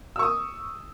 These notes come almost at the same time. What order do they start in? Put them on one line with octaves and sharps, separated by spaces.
E6 C#6 D#6